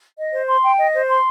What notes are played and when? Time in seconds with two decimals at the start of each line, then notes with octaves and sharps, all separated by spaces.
0.18 D#5
0.33 C5
0.48 C6
0.63 G5
0.78 D#5
0.94 C5
1.09 C6